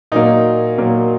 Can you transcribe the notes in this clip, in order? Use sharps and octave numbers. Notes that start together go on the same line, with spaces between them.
A#2 F#3 A#3 D#4
A#2 F#3 A#3